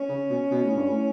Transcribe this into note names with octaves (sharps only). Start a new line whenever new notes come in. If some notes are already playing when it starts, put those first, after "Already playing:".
Already playing: C#4
C#3
B2
B2
A2
G2
A2